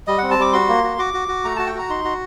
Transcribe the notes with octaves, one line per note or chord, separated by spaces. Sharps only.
G3 D#5
C4 F#5
A5
G3 D6
F#4 C6
A#3
F#4
F#4 D6
F#4
F#4
A3 A#5
F#4 A5
G5
F#4 A#5
D#4 C6
F#4